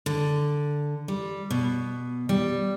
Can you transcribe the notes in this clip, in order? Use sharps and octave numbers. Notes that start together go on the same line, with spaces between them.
D3
G3
B2
G3